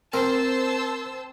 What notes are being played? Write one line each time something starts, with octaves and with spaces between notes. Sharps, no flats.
C4 A#4 C5 A5 E6